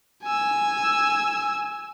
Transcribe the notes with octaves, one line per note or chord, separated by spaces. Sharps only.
G#5 E6